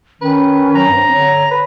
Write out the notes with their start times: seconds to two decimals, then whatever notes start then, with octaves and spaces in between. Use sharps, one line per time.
0.22 D#3 C#4 B4
0.75 F#3 A#5
0.89 G2 C4
1.12 D3 C#5
1.51 B4